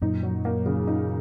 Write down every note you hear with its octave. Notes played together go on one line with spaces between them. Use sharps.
F#2 A#2 D#4
F#3
A#3
C#3
D#4